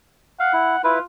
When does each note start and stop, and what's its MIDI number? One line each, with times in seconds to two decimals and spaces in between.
0.40 0.53 77
0.40 0.82 78
0.53 0.76 64
0.84 0.99 64
0.84 1.02 65
0.84 0.99 71